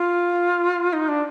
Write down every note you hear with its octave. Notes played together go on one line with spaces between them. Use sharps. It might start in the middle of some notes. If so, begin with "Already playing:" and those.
Already playing: F4
D#4
D4